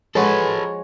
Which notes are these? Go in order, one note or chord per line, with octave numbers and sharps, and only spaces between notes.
F3 G#3 F#4 A4 B4 C#5